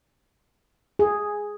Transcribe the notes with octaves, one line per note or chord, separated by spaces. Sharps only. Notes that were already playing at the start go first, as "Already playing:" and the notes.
G#4